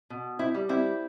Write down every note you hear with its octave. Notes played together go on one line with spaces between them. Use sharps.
B2
C4 E4
G3
C4 E4